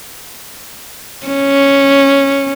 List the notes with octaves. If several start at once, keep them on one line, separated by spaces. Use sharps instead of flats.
C#4